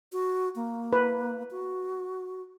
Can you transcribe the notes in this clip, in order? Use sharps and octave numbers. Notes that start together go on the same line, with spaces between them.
F#4
A#3
B4
F#4